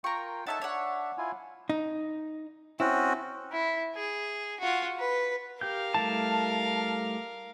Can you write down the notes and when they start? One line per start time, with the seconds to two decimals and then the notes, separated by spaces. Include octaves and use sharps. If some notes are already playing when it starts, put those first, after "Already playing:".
0.04 F4 A#4 G5 C#6
0.46 D#4 A4 C#5 E5 F#5 A5
0.61 D4 C#5 E5 F#5
1.18 E4 F4 G#5
1.70 D#4
2.80 C4 C#4 E4 F#4
3.52 E4
3.95 G#4
4.60 F4 F#4
4.99 B4
5.61 G4 A#4 F5 G5 G6
5.94 G3 A3 E4 A5